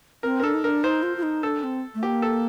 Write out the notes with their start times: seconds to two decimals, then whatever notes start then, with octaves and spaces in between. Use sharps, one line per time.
0.23 C4 A#4
0.40 A#4
0.43 D4 A4
0.54 D#4
0.64 D4 A#4
0.84 D#4 C5
1.03 F4
1.17 F4
1.23 D#4
1.43 D4 A4
1.63 C4
1.95 A3
2.03 A#3 G4
2.22 A4